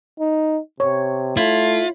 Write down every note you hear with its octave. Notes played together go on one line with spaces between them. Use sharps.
D#4
C3 C#5
A3 E4 F4